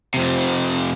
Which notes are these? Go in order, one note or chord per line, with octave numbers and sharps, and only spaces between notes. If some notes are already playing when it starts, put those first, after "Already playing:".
F2 C3